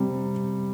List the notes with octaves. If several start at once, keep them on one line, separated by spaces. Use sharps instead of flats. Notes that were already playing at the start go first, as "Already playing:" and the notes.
Already playing: C3 G3